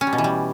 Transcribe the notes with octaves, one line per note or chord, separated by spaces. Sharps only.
C#4
G3
B2
E3
G3